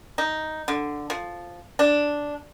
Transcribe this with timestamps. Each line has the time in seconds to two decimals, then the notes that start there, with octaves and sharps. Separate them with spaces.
0.18 D#4
0.68 D3
1.10 F3
1.79 D4